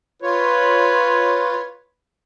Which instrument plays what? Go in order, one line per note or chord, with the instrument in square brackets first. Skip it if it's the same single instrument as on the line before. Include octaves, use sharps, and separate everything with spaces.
[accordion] F4 C#5 [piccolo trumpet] B4